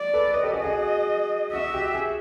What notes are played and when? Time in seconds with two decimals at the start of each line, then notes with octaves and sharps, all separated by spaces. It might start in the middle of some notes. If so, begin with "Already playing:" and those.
Already playing: D5
0.13 A4 B4
0.33 B4 C#5 D#5
0.43 G4 A4
0.53 F#4 G#4
0.64 F#4 G#4
1.53 F#4 E5
1.74 G4
1.94 F#4 G#4